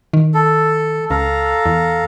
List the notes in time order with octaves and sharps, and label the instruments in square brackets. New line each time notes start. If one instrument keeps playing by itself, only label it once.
[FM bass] D#3
[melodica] A4
[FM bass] C#2 [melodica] A4 F5 A#5
[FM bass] E2